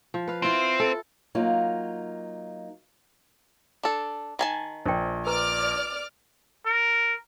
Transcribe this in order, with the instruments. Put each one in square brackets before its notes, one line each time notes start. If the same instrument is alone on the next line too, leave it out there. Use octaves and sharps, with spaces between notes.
[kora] F3
B4 F5
[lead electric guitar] C4 [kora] E4 F4
[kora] A4
[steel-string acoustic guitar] F#3 A#3 D#4 F4
[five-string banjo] D4 A4
D#3 G#5 A5
[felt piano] A#1 [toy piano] C5 G5
[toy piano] B4 A#5 [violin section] D5 D6 F6
[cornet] A#4